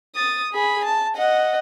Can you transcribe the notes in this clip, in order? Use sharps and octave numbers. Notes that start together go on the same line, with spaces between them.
D#6 A6
G#4 B5
A5
D#5 F#5